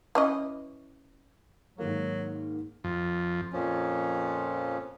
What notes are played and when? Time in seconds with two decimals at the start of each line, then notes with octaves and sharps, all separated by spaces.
0.15 E3 C#4 D#5
1.78 G#2 D#3 F#3 A#3
2.84 F2
3.53 F2 A#2 F3 C#4